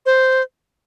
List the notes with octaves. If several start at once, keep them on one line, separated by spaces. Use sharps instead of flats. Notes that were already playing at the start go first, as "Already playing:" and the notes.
C5